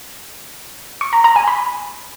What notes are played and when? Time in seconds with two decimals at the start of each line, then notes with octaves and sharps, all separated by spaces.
1.01 C#6
1.13 A#5
1.24 A#5
1.36 G#5
1.48 B5